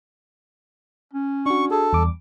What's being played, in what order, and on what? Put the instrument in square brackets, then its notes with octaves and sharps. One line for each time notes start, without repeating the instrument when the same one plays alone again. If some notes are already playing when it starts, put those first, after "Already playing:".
[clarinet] C#4
[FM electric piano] D4 F#4 [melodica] C#6
[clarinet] G#4 [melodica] A4
[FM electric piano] E2 D6 [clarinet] G3